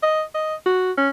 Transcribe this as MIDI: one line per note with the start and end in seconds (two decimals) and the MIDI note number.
0.03 0.23 75
0.35 0.55 75
0.66 0.92 66
0.97 1.10 61